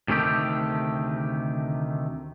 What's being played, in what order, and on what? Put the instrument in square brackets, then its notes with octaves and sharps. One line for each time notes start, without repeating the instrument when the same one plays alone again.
[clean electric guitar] D2 C3 D#3 A3 G4